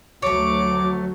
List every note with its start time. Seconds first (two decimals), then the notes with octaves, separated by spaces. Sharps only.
0.22 D2 F#3 A3 C#5 D6